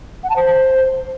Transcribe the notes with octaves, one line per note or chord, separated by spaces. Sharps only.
F#5
A5
C5